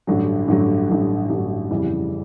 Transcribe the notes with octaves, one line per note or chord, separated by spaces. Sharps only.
A1 G2 D3 F#3
A1 G2 D3 F#3
A1 G2 D3 F#3
A1 G2 D3 F#3
F2 C#3 E3 G3